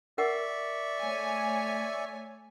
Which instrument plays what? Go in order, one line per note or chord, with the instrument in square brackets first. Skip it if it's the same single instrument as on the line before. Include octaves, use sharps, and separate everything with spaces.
[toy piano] A#4 F#5 [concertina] D5 E5 C#6
[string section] A3 C#5 G#5